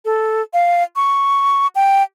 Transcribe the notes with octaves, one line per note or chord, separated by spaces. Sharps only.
A4
F5
C#6
G5